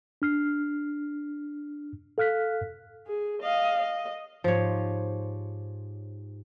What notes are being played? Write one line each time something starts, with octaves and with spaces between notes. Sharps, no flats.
D4 F6 C7
A4 F5 F6 F#6 B6
G#4
D#5 F5
D#5
G#2 F3 G4 C5 C#5